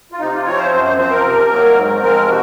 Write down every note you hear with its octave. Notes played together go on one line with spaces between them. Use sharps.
F4
C3 D#4
F4
F3 C4 C#5
C5
F#2 C5
C5
F3 C4 C5
A#4
C3
D#3 F#3 A#3
G#2
F3 G#3 C4 A#4
C3 F#4